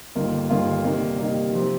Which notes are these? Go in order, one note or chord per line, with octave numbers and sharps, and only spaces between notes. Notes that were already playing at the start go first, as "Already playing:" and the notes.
G1 G2 D#3 A#3 F4
G1 G2 D#3 A#3 F4
C3 D#3 G3 A#3
C3 D#3 G3 A#3
C3 F3 C4 G4